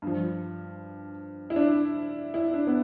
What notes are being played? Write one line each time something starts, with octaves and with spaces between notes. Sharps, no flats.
G2 F3
E4
D4
E4
D4
B3